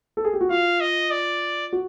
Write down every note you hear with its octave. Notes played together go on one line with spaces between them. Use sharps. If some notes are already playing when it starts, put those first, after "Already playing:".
A4
G#4
G4
F#4
F4 F5
D#5
D5
F#4